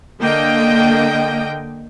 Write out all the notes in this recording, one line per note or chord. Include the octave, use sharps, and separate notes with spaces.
D3 A#3 D#5 G5